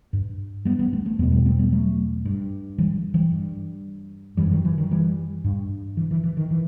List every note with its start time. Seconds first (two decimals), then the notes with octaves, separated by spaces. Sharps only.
0.13 G2
0.65 G3 B3
0.79 G3 B3
0.93 A3 C4
1.06 A3 C4
1.19 E2 B2 G3 B3
1.32 G3 B3
1.45 A3 C4
1.59 G3 B3
1.72 F#3 A3
2.25 G2
2.78 E3 G3
3.14 E3 G3
3.32 G2
4.37 F#2 E3 G3
4.51 D#3 F#3
4.65 E3
4.78 D#3 F#3
4.91 E3 G3
5.44 G2
5.97 E3
6.11 E3
6.24 E3
6.37 D#3
6.51 E3